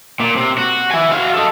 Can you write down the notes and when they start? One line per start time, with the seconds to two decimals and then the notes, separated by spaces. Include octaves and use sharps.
0.20 A#2
0.36 C3
0.58 F#4
0.92 E4 G#5
1.12 F#4 F5
1.34 A4 D#5